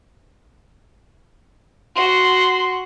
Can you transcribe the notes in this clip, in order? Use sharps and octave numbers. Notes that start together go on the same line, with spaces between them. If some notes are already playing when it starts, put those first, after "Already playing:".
F#4 C6